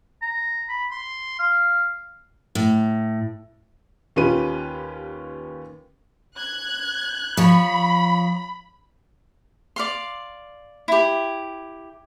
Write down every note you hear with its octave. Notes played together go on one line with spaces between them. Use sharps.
A#5
B5
C6
F5
A2
D#2 C#4 F4 G4 B4 D#7
F#6 G#6
F3 C#5 B5
D5 F5 C6
E4 G4